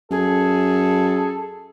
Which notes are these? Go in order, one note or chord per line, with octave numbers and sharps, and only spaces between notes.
F#2 G#4 A4